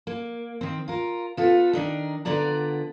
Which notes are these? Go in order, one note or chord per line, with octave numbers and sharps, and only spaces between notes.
A#3
D#3 C4
F4 A#4
B3 F4 A4
D#3 D4 D#4
D3 B3 F4 D5 A#5